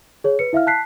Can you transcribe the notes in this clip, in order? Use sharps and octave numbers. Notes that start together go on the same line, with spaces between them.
G#4 C#5
B4 C#7
E4 E5 F5 F6
A5 F#6 B6 C7